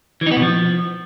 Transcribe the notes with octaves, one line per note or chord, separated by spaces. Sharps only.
E3
D#4
B3
B2
F3